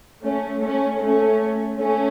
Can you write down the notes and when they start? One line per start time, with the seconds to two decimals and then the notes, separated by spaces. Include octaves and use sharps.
0.23 A3 C#4
0.61 A3 C#4
0.99 A3 C#4
1.76 A3 C#4